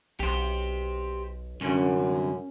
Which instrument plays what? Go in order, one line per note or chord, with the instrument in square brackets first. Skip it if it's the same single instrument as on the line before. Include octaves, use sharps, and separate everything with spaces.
[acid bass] B1 [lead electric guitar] G4 C5
[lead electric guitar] C2 D3 [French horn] F#2 [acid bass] C#4